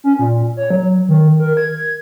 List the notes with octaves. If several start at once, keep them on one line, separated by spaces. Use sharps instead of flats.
C#4
A#2
C#5
F#3
D#3
A#4
G#6